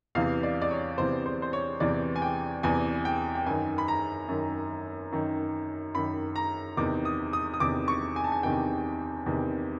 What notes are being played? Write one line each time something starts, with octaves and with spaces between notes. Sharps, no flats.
E2 C3 E3 F5
D5
D5
C#5
E2 C3 E3 C5
C5
C5
C#5
E2 C3 E3 D5
G#5
G5
E2 C3 E3 G#5
G5
G5
F#2 D#3 G#5
B5
A#5
F#2 D#3
F#2 D#3
F#2 D#3 B5
A#5
E2 C3 D#3 D6
D#6
D#6
D#6
E2 C3 D#3 D6
C#6
G#5
A5
G#5
E2 C3 D#3 G5
E2 C3 D#3